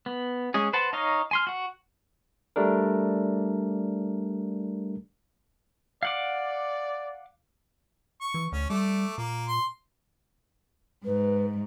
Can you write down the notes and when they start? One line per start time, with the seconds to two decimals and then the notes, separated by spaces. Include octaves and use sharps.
0.06 B3
0.54 G#3 C#4 G#4
0.73 B4 C5 F#5 A5
0.93 D#4 C#5 D#5 F5
1.31 G#5 C6 F6
1.47 F#4 F#5
2.56 G3 A3 D4 A#4
6.03 D5 F5 F#5 D6
8.21 C#6
8.34 E3
8.52 D2 C#4
8.70 G3 A3 D6
9.18 A#2 A#3
9.48 C6
11.06 G#2 B4